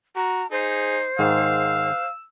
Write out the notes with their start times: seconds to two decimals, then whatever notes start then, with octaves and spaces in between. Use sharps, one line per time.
0.16 F#4 A#5
0.52 D#4 G#4 C5
1.19 G#2 D#3 F5 E6